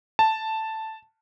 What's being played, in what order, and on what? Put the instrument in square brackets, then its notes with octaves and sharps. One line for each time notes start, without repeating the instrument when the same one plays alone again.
[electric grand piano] A5